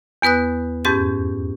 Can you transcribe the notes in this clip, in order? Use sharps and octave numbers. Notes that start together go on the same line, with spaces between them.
E2 B3 B4 D#6 F#6
F2 G#2 C#4 G4 G6 A6